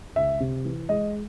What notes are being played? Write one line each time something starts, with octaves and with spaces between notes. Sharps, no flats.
C#2 E5
C3
E3
G#3 D#5